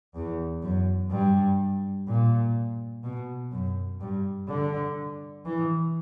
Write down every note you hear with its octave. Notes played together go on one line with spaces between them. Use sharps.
E2
F#2
G2
A#2
B2
F#2
G2
D3
E3